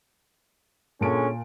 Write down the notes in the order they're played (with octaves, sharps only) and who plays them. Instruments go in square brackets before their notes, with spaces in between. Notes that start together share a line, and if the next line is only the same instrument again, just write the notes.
[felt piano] A#2 A5 D7 [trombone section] D3 G#3 C#4